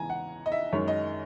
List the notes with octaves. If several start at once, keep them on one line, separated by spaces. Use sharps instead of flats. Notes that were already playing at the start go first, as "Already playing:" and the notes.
Already playing: E2 C#3 E3 G#3 G#5 A#5
F#5
D#5
E5
F#2 D#3 G#3 C#5
D#5